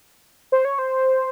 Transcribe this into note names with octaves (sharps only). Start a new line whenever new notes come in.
C5
C#5
C5